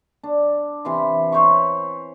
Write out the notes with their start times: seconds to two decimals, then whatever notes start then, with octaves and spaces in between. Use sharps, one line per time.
0.23 D4
0.85 C3 E3 C6
1.32 C5 C#5 B5 C#6